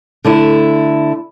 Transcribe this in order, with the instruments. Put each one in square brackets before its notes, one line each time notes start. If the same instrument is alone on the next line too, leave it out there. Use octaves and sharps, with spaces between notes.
[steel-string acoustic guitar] D3 A3 E4